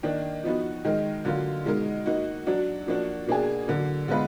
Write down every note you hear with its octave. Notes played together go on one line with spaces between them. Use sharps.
D#3 A#3 D4
F3 B3 D#4 F#4
D#3 G#3 D#4 A#4
D3 F#3 A#3 F4
B2 G#3 D#4 A#4
A#3 D#4 F#4
F#3 D4 F#4
F3 A#3 D4 F#4
B2 A#3 D4 G#4
D3 F#3 A#3
D3 G#3 B3 F4 B4